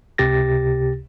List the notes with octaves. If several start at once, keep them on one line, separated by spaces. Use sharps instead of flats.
C#2 C3 G4 A6 A#6